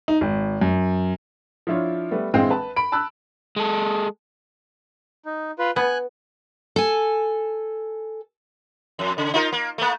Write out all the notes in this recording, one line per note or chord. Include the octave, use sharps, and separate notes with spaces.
D#4
G#1
F#2
F3 D4 E4 F4 C#5
G3 A3 B3
A#1 E3 G#3 C4 F5 G5
B4 A5
B5 D7
A5 B5 E6 F#6
G#3 A4
D#4
F4 B4
B3 G#5 F#6
A4 G#5
F2
C#3
D#4 F4 A#4
A#3
A3 A#3